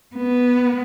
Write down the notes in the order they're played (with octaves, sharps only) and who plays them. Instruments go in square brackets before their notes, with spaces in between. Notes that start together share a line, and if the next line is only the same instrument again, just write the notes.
[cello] B3